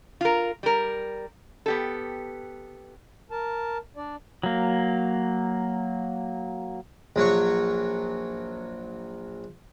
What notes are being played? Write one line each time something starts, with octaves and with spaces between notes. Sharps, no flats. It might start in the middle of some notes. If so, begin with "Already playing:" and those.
F4 A#4
G3 A#4
B3 G4 A4
A#4 A5
D4 D5
F#3 A#3
A#1 F#3 C#5 C#6